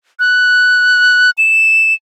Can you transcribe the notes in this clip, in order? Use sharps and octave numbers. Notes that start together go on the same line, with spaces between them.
F#6
E7